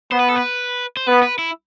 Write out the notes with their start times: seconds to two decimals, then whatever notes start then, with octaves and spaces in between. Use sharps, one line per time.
0.11 B3 C5
0.20 B4
0.29 A4
0.36 B4
0.97 C5
1.07 B3 B4
1.23 B4
1.39 E4